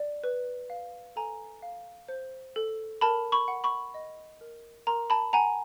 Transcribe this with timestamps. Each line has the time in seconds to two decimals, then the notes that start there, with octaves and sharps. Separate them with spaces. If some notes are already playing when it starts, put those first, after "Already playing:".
Already playing: D5
0.24 B4
0.70 F5
1.16 A4 G#5 A#5
1.62 F5
2.08 C5
2.56 A4
3.01 A#4 A5 B5
3.32 B5 C#6
3.48 F#5
3.64 B5 C#6
3.94 D#5
4.41 A#4
4.87 A#4 A#5 C6
5.10 A5 B5
5.33 F#5 G#5 A#5